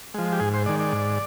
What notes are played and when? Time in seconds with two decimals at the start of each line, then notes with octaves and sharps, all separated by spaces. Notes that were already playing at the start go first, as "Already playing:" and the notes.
0.14 F3 G#3
0.33 G4
0.40 G#2 G#4
0.54 C5
0.66 D#3 G#3 D5
0.79 D5
0.92 G#2